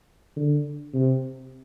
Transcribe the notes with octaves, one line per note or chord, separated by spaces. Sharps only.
D3
C3